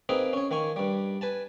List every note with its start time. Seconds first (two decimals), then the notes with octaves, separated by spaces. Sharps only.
0.09 A#3 C4 D#4 G#4 B4
0.33 C#4 C#5
0.51 D#3 A#3 G#5 C#6
0.76 G2 G3
1.21 B4 G#5 A5